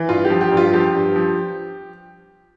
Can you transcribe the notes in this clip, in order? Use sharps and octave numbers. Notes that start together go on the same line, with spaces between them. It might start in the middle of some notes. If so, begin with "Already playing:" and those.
Already playing: E3
G2 F4
G4
F3
G4
G2
F4
F3 G4
G2
F3